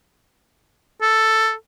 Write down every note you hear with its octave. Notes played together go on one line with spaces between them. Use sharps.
A4